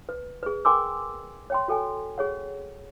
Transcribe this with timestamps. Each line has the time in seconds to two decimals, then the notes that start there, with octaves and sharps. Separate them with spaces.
0.09 B4
0.43 G#4 B4
0.65 A#4 G5 G#5 C6 D6 E6
1.50 C#5 G5 C6
1.68 F#4 A4 G5 G#5
2.18 G#4 C#5 F#5